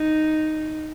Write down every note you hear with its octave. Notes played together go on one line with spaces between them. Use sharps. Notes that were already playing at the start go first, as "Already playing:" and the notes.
Already playing: D#4